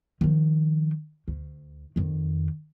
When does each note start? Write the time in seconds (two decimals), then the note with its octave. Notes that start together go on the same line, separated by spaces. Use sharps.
0.21 D#3 F3
1.28 D2
1.96 F2 D#3